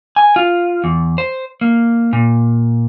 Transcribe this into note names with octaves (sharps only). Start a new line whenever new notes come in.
G#5
F4
E2
C5
A#3
A#2